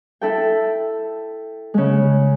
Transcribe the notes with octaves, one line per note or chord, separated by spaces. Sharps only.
E4 A4 G5
C#3 G#3